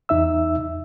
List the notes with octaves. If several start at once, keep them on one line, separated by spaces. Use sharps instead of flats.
E2 D#4 E5 E6